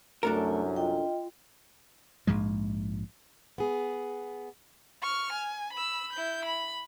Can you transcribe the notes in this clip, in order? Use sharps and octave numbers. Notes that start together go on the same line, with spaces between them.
C2 F#2 A3 D4 A4 A#4
F4 D#5 G5
A#1 G#2 F3 G#3
B3 G#4
C#6 F6
G#5
B5 E6
E4 G6
B5